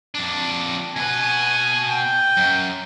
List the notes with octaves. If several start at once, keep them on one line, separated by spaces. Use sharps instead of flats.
F2 D4
B2 B4 G#5
G5
F#2